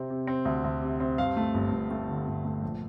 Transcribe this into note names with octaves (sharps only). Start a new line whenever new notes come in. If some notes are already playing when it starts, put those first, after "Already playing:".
Already playing: C3 C4
C3
C4
D2
D2
C3
C4
G2 F5
A3
G1
G1
A3
D3
G1
A3
A#1